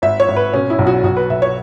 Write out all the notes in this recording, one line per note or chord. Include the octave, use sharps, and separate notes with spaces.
G#1 E5
C#5
G#1
B4
B2 C#4
E4
B1
F#4
B1 F#4
B4
B1 E5
C#5